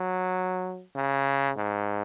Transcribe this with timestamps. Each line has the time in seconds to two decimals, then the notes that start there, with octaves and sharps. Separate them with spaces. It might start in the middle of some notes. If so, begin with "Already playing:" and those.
Already playing: F#3
0.96 C#3
1.56 G#2